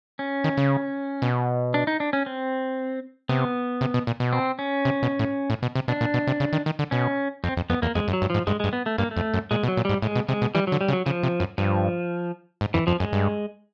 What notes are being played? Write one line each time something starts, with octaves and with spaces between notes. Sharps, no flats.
C#4
D#3
C#3
B2
D4
D#4
D4
C#4
C4
C3 B3
C3
B2
A#2
B2
C4
C#4
C3
B2
A2
A2
B2
C3
B2 D4
A#2
B2
C3
C#3
D#3
D#3
D3
B2 C#4
F2 C4
F2
F2 B3
E2 A#3
F2 G#3
F#2
F#3
G2
G#2 F3
G2 G#3
G#3
G2
B3
A3
G2 A#3
A3
F2
F#2
A#2 G#3
B2
F#3
A#2
G#2 G3
A2 G#3
B2
C3 G#3
B2
E3 G3
F#3
D3
G3
C#3
F#3
C#3 F3
C3
F#2
G2 F3
G#2
F2 E3
F2 F3
F#2 G#3
G2